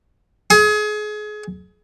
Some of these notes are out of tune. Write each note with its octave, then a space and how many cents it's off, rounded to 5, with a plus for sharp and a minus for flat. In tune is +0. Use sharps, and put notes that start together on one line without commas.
G#4 +30